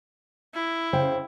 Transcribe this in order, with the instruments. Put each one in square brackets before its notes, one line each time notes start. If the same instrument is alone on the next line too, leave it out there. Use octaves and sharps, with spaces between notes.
[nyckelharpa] E4
[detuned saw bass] C#3 [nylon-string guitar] C5 F5 G5